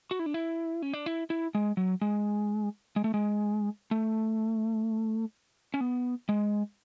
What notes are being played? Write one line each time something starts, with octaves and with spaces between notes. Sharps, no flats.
F#4
E4
D4
E4
C#4
D4
E4
E4
G#3
F#3
G#3
G#3
A3
G#3
A3
C#4
B3
G#3